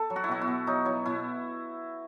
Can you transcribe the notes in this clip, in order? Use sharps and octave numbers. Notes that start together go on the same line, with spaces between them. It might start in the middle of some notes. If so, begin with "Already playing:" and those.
Already playing: A4
F#3
F#4
E4
B2 F#4
E4
B2
F#3 D#4
F#3 E4
B2 E4